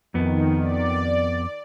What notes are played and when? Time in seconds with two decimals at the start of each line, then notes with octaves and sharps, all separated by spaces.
0.14 F2 D#3 B3
0.61 D5